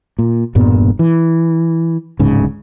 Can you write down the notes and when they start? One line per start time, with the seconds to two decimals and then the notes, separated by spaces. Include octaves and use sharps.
0.19 A#2
0.55 E1 G2 A#2 B3
0.99 E3
2.19 D1 G#2 C#3